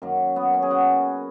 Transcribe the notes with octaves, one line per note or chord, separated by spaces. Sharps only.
F#2 D#3 F#3 A#3
B3
C#4
G#4
F#4